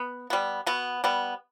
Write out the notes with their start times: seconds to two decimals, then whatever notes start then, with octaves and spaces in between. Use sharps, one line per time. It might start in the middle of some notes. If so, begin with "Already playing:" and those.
Already playing: B3
0.30 G3 B3
0.66 B2 B3
1.04 G3 B3